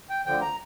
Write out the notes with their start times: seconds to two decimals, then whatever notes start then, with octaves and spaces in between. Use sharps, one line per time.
0.10 G5
0.26 D2 D3 F3 G5
0.41 A#5